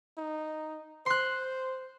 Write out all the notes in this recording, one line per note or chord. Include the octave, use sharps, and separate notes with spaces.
D#4
C5 C6 F#6